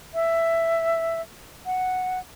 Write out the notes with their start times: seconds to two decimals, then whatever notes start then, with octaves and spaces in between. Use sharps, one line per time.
0.14 E5
1.66 F#5